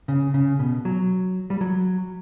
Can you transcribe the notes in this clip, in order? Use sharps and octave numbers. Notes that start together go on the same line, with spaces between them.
C#3
C#3
B2
F#3
G3
F#3